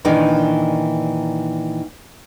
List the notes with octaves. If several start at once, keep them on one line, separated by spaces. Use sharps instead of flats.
A#2 D#3 E3 D4 D#4